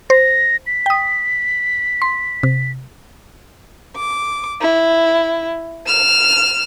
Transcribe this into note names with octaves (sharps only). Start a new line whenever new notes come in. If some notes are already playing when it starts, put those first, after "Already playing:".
C5 A#6
B6
G5 D#6
C6
C3
D6
E4
F6 E7